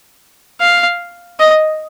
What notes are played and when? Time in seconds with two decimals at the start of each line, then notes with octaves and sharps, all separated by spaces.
0.61 F5
1.40 D#5